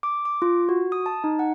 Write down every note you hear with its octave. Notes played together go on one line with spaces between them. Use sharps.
D6
D6
F4
F#4
D#6
A5
D#4
F#5